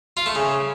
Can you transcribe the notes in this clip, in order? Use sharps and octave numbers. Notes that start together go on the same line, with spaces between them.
F4
A3
C#3